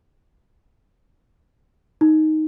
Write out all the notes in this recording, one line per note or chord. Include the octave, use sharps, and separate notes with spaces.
D#4